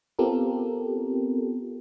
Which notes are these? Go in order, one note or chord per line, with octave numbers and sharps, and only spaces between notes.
B3 C4 F4 G4 A4 A#4